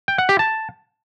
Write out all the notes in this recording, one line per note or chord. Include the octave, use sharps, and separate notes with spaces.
G5
F#5
G4
A5